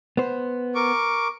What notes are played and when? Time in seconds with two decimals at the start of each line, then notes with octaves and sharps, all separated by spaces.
0.17 B3 C5
0.75 A#4 C#6 D6